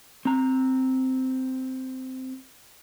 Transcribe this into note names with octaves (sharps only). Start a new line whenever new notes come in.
C4 A#5